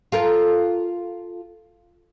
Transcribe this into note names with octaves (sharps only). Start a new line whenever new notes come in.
F4 A4 A#4